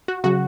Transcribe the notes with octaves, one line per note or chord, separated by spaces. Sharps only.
F#4
C#3 F#3 F#4